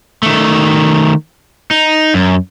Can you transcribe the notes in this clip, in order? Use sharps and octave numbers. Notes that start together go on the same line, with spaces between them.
D#3 A3
D#4
F#2